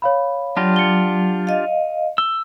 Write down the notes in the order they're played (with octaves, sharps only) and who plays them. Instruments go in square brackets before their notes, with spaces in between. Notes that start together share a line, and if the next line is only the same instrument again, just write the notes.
[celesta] C#5 F5 B5
[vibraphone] F#3 [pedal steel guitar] D4 F4 G4
[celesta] C#7 G7
[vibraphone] D#5 F5
[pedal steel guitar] E6 [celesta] G7